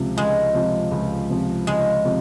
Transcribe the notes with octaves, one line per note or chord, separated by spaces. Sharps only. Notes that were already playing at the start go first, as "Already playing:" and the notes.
Already playing: C#2 C3 F3
C#2 G#3
C3 F3
C#2
C3 F3
C#2 G#3
C3 F3